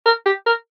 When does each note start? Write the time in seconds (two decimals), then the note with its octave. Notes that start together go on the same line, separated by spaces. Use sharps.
0.06 A#4
0.26 G4
0.46 A#4